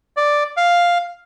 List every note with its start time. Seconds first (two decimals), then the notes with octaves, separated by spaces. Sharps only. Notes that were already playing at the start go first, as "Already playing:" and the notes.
0.17 D5
0.57 F5